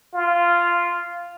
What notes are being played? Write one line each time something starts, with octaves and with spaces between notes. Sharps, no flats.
F4